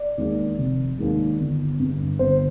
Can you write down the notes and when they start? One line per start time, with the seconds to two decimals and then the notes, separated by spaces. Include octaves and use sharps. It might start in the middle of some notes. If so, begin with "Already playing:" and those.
Already playing: D5
0.18 D#2 D#3 G#3
0.58 F1
0.99 D#2 D#3 G#3
1.39 G1
1.79 G2 D3
2.19 G1 C5